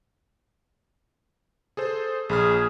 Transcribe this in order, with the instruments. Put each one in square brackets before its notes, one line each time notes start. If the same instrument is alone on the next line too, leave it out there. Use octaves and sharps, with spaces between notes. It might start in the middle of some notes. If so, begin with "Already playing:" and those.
[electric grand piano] G#4 A4 C5
[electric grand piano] A#1 B5 F6 [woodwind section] G#4